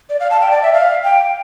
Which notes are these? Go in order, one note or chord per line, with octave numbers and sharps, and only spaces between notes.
D5
F5
A5
G5
D5
E5
F5
G5